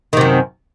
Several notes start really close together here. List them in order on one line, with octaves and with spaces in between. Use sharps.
D#3 C3 F#2